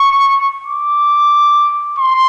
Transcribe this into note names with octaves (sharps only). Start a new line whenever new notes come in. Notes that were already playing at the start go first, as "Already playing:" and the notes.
Already playing: C#6
D6
C6